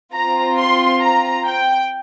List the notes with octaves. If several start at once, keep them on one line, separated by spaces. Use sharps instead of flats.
C4 F4 A#5
C6
A#5
G5